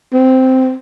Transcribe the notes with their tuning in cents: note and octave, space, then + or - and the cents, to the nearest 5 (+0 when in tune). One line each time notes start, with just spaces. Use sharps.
C4 -10